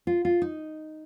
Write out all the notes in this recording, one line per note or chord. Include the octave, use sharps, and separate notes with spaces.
F4
F4
D#4